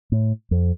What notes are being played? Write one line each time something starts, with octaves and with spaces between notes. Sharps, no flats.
A2
F2